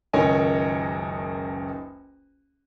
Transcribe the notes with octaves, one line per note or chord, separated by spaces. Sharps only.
F#1 C#2 D#3 C#5 D#5 G#5